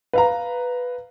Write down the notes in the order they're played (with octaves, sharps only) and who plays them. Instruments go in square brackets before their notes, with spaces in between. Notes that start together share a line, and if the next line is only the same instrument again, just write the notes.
[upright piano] B4 F5 A#5